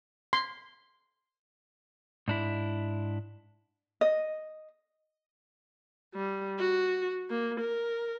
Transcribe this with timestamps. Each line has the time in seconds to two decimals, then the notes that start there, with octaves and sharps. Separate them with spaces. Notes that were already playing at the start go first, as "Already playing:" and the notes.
0.33 C6
2.28 G#2 D4 E4
4.01 D#5
6.14 G3
6.59 F#4
7.30 A#3
7.61 A#4